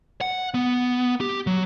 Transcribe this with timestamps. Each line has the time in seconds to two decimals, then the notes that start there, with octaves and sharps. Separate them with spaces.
0.21 F#5
0.55 B3
1.21 G4
1.47 F#3